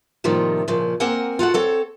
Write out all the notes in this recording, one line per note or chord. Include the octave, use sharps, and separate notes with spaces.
A2 C3 D#3 F3 G3 A#3
A#2 C#3 F3
A#3 C4 A#4 F#5 G#5
F4 F#4 A4 F#5
C4 A4 C#5